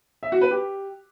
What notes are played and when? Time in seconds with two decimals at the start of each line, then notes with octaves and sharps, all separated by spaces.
0.23 E5
0.32 F#4
0.41 B4
0.51 G4